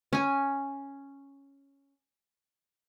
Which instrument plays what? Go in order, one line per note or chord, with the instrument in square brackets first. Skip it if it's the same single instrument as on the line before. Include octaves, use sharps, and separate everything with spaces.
[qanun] C#4 G#5